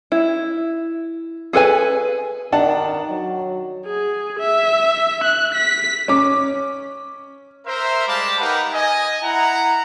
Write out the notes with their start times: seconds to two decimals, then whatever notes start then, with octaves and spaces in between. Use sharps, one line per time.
0.12 E4
1.53 G#4 A4 B4 G#5
2.52 D#3 D4 F#5 A5
3.11 F#3
3.86 G#4
4.39 E5
5.24 F#6
5.54 B6
6.08 C#4 D6
7.66 A#4 C5 E5
8.07 G3 G#3 F5 A5 B5 D6
8.40 D#4 G4 A#4 B4 F#5 G5
8.73 D#5 G#5
9.23 E4 F#5 A#5